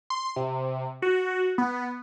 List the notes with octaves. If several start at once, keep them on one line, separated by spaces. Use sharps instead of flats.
C6
C3
F#4
B3